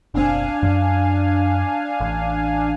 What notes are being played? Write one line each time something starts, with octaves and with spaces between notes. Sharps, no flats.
F#1 B1 C4 D4 F5 G#5
F#2
A1